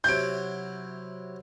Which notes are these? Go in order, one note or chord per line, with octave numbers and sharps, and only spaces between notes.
C3 F#3 E4 G6 D7